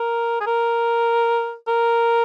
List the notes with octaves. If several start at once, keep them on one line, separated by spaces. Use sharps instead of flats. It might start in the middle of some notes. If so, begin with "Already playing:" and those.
Already playing: A#4
G#4
A#4
A#4